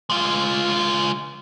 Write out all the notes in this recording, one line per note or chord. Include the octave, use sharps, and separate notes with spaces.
G#3 F4